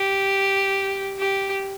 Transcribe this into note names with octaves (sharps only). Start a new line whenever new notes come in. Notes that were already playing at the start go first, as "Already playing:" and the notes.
Already playing: G4
G4